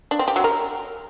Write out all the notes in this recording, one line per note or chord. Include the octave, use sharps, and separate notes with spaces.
D4
C4
G4
F#3
A#4